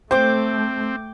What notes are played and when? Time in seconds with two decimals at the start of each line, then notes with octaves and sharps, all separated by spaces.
0.11 A3 C4 C5 G5 D6